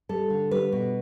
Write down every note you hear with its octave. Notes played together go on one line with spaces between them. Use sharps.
G3 A4
D3
G3 B4
B2